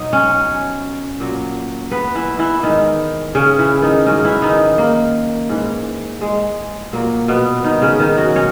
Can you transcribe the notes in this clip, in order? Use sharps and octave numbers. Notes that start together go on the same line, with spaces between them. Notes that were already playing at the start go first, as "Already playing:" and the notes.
Already playing: B2 F#3 D#4 D#5
C#4 C#5
A#2 F#3
B3 B4
E3 E4
E3 E4
G#2 D#3 E3 D#4
C#3 C#4
E3 E4
D#3 D#4
G#2 C#3 F#3 C#4
E3 E4
D#3 D#4
A#3
G#2 E3
G#3
A#2 F#3 A#3
B2 B3
D#3 D#4
C#3 C#4
D#3 D#4
F#3 F#4
B2 C#4 C#5